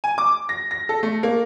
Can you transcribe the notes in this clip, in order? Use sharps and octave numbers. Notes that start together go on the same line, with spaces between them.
G#5
D6
A#6
A#6
A4
A3
A#3